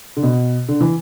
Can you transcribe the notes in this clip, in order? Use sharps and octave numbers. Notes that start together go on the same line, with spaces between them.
D3
B2
D3
E3